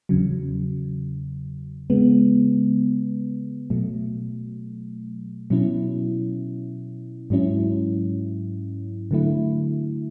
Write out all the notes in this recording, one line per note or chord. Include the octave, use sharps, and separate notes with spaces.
E2 C#3 F#3
C#3 G#3 B3
B2 F#3 A3
B2 F#3 C#4 E4
G#2 F#3 C#4 E4
D3 F#3 A3 E4